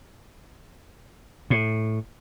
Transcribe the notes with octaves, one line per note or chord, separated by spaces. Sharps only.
A2